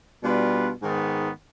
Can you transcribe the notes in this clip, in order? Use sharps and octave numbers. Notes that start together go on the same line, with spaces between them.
B2 G3 D4 F4 B4
G#2 D#3 B3